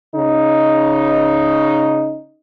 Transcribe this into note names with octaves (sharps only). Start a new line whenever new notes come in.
C#3 D#4